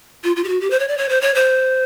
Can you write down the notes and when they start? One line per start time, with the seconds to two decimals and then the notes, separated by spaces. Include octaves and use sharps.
0.24 F4
0.36 F4
0.44 G4
0.48 F#4
0.61 G4
0.70 C5
0.79 C#5
0.88 D5
0.98 C#5
1.09 C5
1.21 C#5
1.35 C5